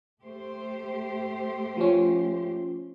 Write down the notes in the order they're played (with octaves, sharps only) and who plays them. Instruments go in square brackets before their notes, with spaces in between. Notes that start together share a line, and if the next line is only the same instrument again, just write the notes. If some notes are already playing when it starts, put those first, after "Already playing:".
[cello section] A3 G4 C5
[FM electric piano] F3 C#4